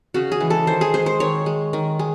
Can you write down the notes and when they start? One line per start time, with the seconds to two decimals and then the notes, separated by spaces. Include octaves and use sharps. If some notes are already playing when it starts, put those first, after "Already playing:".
0.14 C#3 F#4
0.32 G#4
0.40 E3 G#3
0.50 A4
0.67 D#3 C5
0.81 G#4
0.94 G#3 C5
1.06 C5
1.20 D#3 C#5
1.46 G#3
1.73 D#3
1.99 G#3